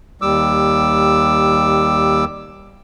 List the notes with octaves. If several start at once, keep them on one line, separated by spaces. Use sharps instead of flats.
D#2 G3 D6 E6